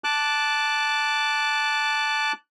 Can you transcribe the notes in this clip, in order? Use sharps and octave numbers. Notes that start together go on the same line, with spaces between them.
A5 D6 F#6